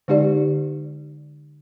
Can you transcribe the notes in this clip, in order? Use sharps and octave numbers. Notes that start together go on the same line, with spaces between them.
D3 G#3 D#4 G4 D5